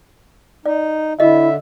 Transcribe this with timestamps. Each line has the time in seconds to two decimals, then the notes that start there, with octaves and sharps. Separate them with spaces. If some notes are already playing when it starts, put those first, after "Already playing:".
0.66 D#4 D5
1.20 D3 E4 F#4 D#5 E5